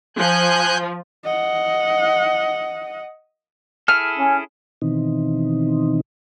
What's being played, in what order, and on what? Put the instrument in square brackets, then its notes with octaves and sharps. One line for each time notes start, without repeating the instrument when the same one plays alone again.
[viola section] F3 [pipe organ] G#5 F#6 G6
[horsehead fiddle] D#5 F#5
[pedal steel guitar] E4 G#4 A4 [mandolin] F6
[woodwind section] C#4
[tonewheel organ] B2 D#3 E3 C4 D#4